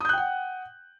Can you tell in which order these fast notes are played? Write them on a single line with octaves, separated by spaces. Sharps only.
D#6 G6 F#6 G5 F#5